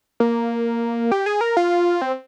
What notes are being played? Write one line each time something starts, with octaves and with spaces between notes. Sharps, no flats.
A#3
G4
G#4
A#4
F4
C4